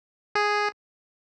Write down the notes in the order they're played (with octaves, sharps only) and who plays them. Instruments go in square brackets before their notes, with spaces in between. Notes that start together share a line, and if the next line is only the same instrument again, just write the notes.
[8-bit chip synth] G#4